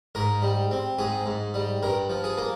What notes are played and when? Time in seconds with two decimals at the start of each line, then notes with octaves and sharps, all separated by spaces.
0.15 G#2 A#4
0.42 G3
0.71 C4
0.99 G#2 G#4
1.26 G#2
1.54 G3
1.83 G2 A#4
2.10 F3
2.24 G#4
2.37 A#3